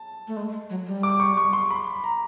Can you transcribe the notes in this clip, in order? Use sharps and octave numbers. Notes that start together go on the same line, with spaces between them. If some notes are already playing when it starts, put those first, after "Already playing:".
Already playing: A5
A3
G#3
F#3
G3
D6
C#6
C#6
C6
B5
A#5